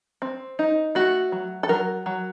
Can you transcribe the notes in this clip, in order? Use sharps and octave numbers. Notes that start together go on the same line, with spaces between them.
C4
D#4
A3 F#4
F#3
A4
F#3 A#4
F#3